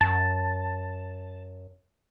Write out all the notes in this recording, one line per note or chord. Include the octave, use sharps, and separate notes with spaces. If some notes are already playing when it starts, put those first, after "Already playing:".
F#2 A5